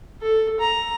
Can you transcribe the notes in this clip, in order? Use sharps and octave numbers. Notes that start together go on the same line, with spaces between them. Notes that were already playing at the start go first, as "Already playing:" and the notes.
A4
A#5